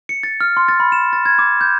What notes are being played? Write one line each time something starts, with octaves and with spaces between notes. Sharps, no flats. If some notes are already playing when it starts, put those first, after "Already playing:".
C#7
A6
F6
C6
A6
B5
E7
A6
G#6
D6
G6